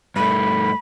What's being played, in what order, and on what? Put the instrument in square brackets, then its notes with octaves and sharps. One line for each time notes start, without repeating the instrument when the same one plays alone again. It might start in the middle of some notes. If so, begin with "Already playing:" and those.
[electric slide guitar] G2 A3 [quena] B5